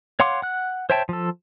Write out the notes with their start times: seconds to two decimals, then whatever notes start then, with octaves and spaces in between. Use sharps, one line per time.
0.20 C#5 F5 F#5 C6 D6
0.42 F#5 F#6
0.90 C5 C#5 E5 G5 A5
1.09 F3 A4